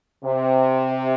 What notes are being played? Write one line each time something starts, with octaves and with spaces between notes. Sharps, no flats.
C3